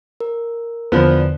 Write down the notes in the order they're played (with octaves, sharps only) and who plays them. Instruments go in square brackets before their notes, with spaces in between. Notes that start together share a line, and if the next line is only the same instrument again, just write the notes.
[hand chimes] A#4
[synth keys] E2 D3 [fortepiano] F3 B3